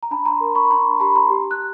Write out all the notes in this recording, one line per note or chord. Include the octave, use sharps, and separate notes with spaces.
A#5
D4 A5 B5
A#5 C6
A#4
B5 C#6
D4 A#5 C6
G4 A5 B5
A#5 C6
G4
F#6